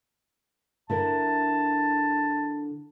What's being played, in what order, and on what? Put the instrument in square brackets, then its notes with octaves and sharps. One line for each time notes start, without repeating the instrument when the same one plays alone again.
[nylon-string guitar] D3 E4 A#4 [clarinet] A5